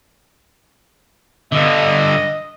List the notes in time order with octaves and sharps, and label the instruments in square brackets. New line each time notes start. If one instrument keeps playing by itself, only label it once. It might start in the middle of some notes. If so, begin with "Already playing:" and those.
[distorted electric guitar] G2 D3 [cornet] D#5